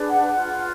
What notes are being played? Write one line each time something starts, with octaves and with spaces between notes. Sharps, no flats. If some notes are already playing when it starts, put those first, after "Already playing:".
Already playing: D4 G#4 B4
F#5
F4 B4 F#5